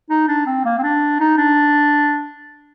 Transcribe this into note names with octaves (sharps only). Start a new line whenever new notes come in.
D#4
D4
C4
A#3
C4
D4
D#4
D4